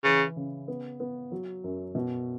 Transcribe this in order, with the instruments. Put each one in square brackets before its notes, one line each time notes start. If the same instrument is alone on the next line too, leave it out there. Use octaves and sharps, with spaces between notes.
[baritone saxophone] C#3 [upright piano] E3
[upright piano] C#3
B3
B3
F#3
F#2
B2